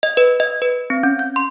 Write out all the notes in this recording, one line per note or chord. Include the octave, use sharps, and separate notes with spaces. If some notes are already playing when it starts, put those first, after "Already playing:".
D#5
B4
D#5
B4
C4
C#4
G6
C6